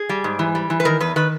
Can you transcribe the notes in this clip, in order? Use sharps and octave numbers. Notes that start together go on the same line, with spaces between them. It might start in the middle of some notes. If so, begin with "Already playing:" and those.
Already playing: G#4
G3
G#2
E3
G3
E3
B4
D#3 A#4
E2 B4
D#3 B4